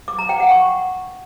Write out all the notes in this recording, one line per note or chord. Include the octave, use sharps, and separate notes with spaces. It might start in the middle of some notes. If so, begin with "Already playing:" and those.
D6
A#5
G5
F#5
C#6